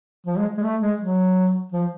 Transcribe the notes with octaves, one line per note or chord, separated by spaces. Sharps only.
F3
G#3
G#3
A3
G#3
F#3
F3